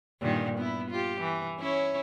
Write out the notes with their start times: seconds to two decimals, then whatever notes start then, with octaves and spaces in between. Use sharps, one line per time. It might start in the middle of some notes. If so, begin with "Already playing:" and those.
0.22 G2 A#2 D#3
0.58 B3 E4
0.90 F4 G4
1.21 E3
1.59 C#4 E4 C#5